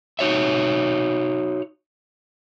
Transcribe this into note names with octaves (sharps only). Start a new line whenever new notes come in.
D#4 F#4 C#5 E5